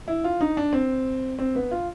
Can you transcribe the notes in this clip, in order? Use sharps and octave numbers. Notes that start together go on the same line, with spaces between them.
E4
F4
D#4
D4
C4
C4
B3
F4